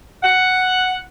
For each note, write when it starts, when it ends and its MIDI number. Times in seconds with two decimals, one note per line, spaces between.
0.23 0.96 78